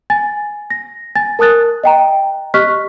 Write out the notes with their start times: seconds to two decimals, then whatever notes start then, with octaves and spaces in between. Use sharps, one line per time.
0.10 G#5 A6
0.70 A#6
1.15 G#5 A6
1.39 A#4 A5 D#6 F#6 A6
1.84 D#5 G5 A#5
2.54 G4 D#5 C#6 F6 F#6 B6